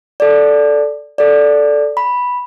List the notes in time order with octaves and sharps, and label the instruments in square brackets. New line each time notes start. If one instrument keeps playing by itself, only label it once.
[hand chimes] A4 D5
A4 D5
B5